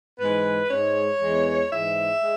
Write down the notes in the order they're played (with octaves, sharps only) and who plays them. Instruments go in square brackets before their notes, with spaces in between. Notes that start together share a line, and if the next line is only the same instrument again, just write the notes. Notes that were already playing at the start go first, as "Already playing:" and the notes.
[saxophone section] G#2 E3 G#3 B4
G#2 G#3 C#5
E2 E3 G#3
G#2 E3 G#3 E5
G#3